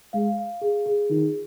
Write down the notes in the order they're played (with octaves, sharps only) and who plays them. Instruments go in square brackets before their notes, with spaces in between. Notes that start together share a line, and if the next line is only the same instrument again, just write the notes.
[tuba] G#3 [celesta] F5
[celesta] F5
G#4
G#4
[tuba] D#3 [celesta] F4